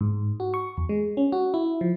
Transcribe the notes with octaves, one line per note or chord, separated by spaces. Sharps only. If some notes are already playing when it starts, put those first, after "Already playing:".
G#2
F#4
C#6
E2
G#3
C#4
F#4
E4
F3